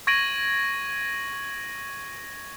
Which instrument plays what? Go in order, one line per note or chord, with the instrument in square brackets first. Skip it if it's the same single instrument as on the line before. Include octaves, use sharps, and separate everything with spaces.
[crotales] C#6 G#6 A#6 D7 D#7 F#7